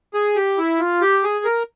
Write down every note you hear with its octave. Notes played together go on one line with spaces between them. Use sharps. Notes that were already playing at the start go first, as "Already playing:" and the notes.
G#4
G4
E4
F4
G4
G#4
A#4